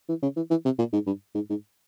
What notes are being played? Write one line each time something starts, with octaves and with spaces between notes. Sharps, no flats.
E3
C#3
E3
E3
C3
A#2
G#2
G2
G#2
G#2